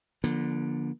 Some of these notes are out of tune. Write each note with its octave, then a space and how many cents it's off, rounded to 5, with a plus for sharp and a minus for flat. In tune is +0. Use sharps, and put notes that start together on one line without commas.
D3 +0 F3 +0 A#3 +45